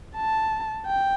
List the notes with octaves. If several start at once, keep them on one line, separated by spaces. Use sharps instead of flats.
A5
G5